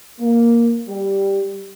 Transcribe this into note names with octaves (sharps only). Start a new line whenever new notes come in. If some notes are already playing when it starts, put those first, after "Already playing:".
A#3
G3